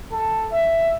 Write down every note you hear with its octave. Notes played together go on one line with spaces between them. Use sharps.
A4
E5